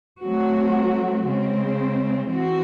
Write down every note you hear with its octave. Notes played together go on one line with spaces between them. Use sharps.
F#3 A3 C4 F#4
C#3 G#3 C4
E3 C4 F#4